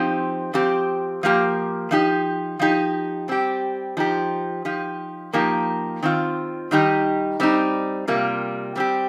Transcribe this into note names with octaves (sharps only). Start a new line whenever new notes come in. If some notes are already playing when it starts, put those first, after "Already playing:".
Already playing: F3 C4 D#4 G4
F3 C4 G4
F3 A#3 G4
F3 D#4 G4
F3 D#4 G4
G3 C4 G4
F3 D#4 G4
F3 D#4 G4
F3 A#3 D#4 G4
D#3 C4 F4
D#3 G3 D#4 G4
G3 C4 D#4
C3 G3 A#3 F4
G3 C4 G4